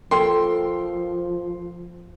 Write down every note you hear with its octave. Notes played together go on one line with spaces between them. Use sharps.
F3 A4 A#4 G5 C6